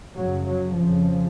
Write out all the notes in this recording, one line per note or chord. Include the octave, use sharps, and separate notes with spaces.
F#2 C#3 F#3
F#3
F2 C#3 F3